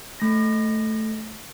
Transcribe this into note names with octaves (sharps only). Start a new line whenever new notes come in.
A3 A#6